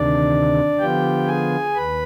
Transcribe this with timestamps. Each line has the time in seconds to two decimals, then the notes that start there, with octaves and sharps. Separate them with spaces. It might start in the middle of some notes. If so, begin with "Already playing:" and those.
Already playing: D2 C3 D#3 D4 D5
0.79 D3 F3 B3 F4 G4 G5
1.27 G#4 G#5
1.75 D#2 B4 B5